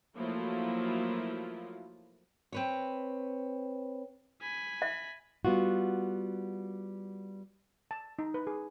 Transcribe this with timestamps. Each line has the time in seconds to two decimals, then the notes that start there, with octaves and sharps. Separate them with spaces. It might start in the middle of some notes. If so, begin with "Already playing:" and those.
0.15 F3 F#3 A3 A#3 E4 F4
2.52 C4 B4 C#5
4.41 G#5 B5
4.82 E5
5.45 G3 B3 F4 F#4
7.91 A5
8.19 D#4
8.34 B4
8.47 G#4